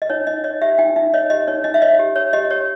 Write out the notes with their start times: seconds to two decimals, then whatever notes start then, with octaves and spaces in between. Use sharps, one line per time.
0.02 D#5
0.10 D#4 C#5
0.27 D#4 D#5
0.44 C#5 D#5
0.62 G4 E5
0.78 D#4 G5
0.96 D#4 E5
1.14 C#5 D#5
1.30 G4 D#5
1.47 D#4 C#5
1.64 D#4 D#5
1.74 E5
1.82 C#5 D#5
1.99 G4
2.16 C#5
2.33 G4 D#5
2.50 G4 C#5